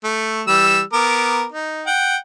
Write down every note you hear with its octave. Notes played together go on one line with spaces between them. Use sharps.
A3
E3 G3 E6
B3 A#4 D6
D#4
F#5 G5